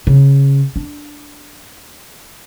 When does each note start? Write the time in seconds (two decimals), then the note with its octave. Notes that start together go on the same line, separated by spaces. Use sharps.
0.07 C#3
0.76 D4